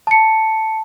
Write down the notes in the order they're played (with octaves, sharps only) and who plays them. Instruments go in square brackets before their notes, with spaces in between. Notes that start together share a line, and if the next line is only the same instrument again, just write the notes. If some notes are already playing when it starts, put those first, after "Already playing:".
[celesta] A5 C#7